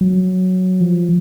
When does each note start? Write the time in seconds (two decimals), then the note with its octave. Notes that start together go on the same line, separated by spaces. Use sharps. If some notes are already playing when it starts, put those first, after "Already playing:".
0.01 F#3
0.81 F3